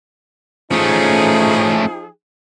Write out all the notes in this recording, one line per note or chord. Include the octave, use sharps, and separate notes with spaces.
F3 A3 C#4 D#4 G#4